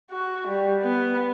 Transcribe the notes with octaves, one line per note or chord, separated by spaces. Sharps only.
F#4
G3
B3